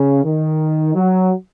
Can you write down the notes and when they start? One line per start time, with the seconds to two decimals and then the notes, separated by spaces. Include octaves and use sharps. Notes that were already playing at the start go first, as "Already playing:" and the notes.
Already playing: C#3
0.23 D#3
0.94 F#3